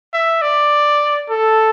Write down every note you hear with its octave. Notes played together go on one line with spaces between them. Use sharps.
E5
D5
A4